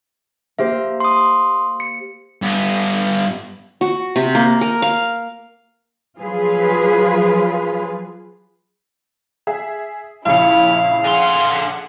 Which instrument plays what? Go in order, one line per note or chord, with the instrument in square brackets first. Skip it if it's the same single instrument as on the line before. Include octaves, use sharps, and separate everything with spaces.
[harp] A#3 G4 C5 [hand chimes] E5
[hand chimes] C6 D#6
C#7
[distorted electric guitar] G2 B3
[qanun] F#4
C3
A#3
A#4
F5
[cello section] F3 F#3 F4 G#4 B4
[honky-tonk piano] G#4 E5
[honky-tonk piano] A#1 C#3 C#7 [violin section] E4 [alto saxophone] F5
[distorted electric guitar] D3 C6 [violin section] G#4 F#5